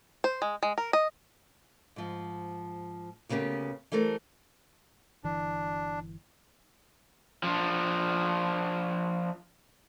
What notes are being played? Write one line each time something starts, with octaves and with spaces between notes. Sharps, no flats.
C5
G#3
G#3
A#4
D#5
G#2 F3
D2 C#3 A#3 B3 G4
E3 G3 A3 A#4 C5
G1 D3 E3 D4
F3 D4